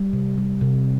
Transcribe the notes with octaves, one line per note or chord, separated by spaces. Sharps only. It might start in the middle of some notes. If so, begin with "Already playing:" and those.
Already playing: G3
C3
G3
C3